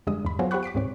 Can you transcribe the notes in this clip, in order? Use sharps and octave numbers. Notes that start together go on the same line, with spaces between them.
F2 D3 G3 G#3 D#6
E2 G2 B5
F#3 B3 F4 F#4 G#4 C5
G4 C5 F#5 B5 C#6 F#6
D6 B6 C7 D7
C#2 G#2 C3 D#3 C4 C#5